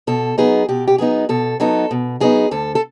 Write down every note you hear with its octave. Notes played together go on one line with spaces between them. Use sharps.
B2 A4
F#3 B3 D#4 G#4
B2 G4
G4
F#3 B3 D#4 G#4
B2 A4
F#3 B3 D#4 A4
B2
F#3 B3 D#4 G#4
D2 A4
A4